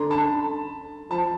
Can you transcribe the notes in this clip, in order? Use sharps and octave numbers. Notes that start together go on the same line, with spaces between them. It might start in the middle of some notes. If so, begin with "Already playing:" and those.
Already playing: D3 A#5 C6
A5 B5
F3 A5 B5